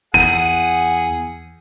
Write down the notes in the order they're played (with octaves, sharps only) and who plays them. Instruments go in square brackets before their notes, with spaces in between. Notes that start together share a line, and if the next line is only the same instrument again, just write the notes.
[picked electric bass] E2 [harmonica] G#4 F#5 G#5 [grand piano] D#7